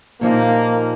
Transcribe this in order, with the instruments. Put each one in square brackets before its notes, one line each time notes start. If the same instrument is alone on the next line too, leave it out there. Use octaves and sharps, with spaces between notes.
[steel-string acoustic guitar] A#2 F3 D#4 G4 [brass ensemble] A#3